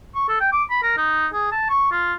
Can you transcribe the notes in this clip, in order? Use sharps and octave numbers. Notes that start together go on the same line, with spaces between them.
C#6
A4
G5
D6
B5
A#4
D#4
G#4
A5
C#6
F4